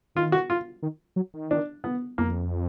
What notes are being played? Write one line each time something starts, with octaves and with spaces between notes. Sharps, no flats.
D#3 F4
F#4
F4
D#3
F#3
D#3
D4
B3
F2 A#3